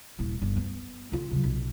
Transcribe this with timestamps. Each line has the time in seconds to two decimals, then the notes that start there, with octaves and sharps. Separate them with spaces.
0.19 D#1 E4
0.42 G1
0.56 B3
1.12 D3 F4
1.31 C#3 F#3
1.44 B1